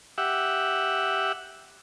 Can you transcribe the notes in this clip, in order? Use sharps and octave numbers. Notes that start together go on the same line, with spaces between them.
G4 E5 F#5